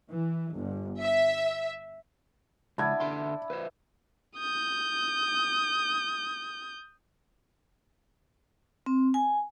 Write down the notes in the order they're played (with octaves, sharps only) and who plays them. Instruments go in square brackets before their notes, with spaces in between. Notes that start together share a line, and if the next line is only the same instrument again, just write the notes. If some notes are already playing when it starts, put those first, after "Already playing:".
[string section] E3
G1
E5
[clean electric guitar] C#2 [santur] B3 D4 E4 [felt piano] A5 G#6
[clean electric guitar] D3 E5 C6
B4 C5 E5
[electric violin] D#6 G6
[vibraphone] C4
G#5